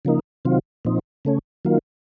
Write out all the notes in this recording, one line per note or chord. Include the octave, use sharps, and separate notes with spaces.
C#3 F3 A#3 D#4
C3 D#3 F#3 C4 F4
A#2 F3 C4 D#4
C#3 A3 C#4
D#3 F#3 A#3 F4